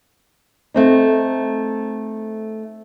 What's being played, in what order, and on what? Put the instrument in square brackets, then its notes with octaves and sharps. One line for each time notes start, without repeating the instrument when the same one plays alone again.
[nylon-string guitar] A3 C4 D#4